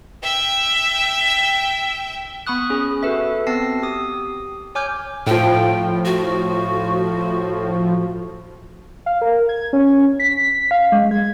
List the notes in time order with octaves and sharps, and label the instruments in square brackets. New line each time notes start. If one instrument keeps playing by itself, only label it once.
[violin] E5 G5
[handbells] B3 B5 C#6 D#6 F#6
C#4 G#4
F#4 A4 B4 E5
B3 C4 A5 E6 A#6 C7
G4 D#6
C#5 G#5 D6 F6 G6
[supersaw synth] A2 F3 [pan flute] G5
[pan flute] F#4
[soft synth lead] F5
A#4
G#6
C#4
B6
F5
G#3
G#6